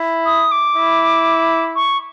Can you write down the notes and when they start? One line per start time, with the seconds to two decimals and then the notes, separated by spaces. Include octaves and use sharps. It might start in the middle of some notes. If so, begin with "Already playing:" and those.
Already playing: E4
0.26 D#6
0.52 D6
0.76 E4
1.76 C#6